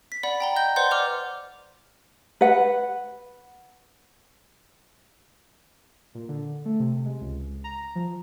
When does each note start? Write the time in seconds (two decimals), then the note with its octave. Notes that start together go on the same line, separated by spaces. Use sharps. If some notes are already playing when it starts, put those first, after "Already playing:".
0.12 B6
0.23 D5 F#5 B5
0.40 G5 A#5 G7
0.56 D#5 G6 G7
0.76 B4 C5 D5 F#5 C6 G6
0.91 D5 F#5 D6 F6 F7 G7
2.41 B4 F#5
6.15 A#2
6.29 D3
6.65 A3
6.80 C3
7.05 G#3
7.21 C#2
7.64 A#5
7.95 F3